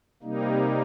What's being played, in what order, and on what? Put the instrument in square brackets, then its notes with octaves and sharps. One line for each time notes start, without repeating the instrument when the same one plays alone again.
[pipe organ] C3 G3 A#3 D#4